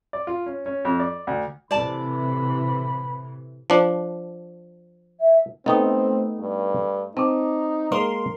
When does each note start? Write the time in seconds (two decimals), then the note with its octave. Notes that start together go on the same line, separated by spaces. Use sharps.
0.13 D5
0.27 F4
0.46 C#4
0.66 C#4
0.85 F2
1.00 D5
1.27 D2
1.71 A2 C3 E3 D5 A5 B5
3.70 F3 D4
5.20 E5
5.66 A3 B3 C4 D#4 D#5 G5 D#6
6.39 G2
7.17 C4 D#4 A5 D6
7.92 G#3 A#3 A#4 C6